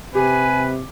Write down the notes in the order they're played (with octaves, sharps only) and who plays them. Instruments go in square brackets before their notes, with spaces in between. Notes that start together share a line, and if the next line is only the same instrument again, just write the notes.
[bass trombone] C3 [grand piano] G4 [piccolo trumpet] B4 [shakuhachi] G#5